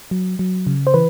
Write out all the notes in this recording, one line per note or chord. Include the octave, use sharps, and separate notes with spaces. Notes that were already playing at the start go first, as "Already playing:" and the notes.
F#3
F#3
C#3
C5
E3 B4